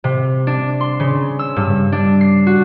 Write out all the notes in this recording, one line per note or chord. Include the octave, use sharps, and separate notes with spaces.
C3
D4
C6
C#3
E6
G2
D4
C7
F#4